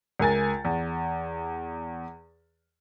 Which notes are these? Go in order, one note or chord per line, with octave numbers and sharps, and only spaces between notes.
C#2 A#4 G#5 A6
E2